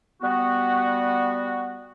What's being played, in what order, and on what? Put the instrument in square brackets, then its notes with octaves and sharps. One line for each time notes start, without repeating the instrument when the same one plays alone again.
[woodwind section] G3 B3 F#4